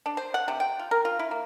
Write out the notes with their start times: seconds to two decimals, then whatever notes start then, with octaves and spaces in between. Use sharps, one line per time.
0.06 D4
0.17 C5
0.34 F#5
0.48 C3
0.60 G5
0.79 F4
0.91 A#4
1.05 F4
1.19 E4
1.31 A#3